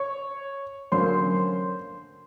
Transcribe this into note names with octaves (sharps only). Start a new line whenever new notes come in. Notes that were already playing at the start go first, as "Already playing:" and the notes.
Already playing: C#5 C#6
D3 F#3 A#3 C#4 C5 C6